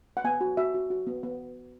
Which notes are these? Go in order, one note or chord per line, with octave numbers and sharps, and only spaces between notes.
F#5
B3 G#5
F#4
F#4 E5
F#4
F#4
B3
B3